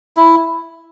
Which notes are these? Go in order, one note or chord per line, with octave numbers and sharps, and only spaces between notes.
E4